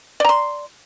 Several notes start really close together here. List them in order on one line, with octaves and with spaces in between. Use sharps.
D5 A#5 C6